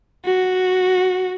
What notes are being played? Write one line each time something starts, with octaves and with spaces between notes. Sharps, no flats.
F#4